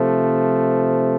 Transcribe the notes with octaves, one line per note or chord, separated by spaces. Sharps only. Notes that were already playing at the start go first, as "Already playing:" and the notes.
Already playing: C3 F3 A3